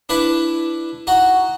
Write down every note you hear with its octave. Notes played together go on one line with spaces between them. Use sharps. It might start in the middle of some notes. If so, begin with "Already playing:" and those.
D4 E4 B4 A5
D#4 F#4